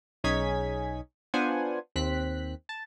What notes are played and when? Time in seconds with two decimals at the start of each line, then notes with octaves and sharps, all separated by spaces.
0.24 B1 C#4 D#4 G#4 G#6 B6
1.34 B3 D4 F4 C5 F#5 G#5
1.96 D#2 C4 F#6 B6
2.69 A5